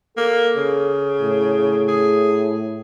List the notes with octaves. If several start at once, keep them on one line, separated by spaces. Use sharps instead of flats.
A#3 A4
C#3
A2
G#4